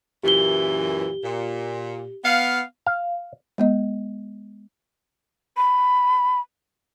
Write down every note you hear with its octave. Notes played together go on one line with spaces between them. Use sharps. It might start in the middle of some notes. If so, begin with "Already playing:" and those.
F#2 A#2 E3 G4 G7
A#2
B3 F5
F5
G#3 B3 D#5
B5